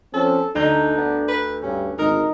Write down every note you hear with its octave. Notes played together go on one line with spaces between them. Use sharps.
F3 C4 C#4 A4
D2 D4 D#4 A#5 G6
B3
B4
G2 C#4
G#1 D#4 A#4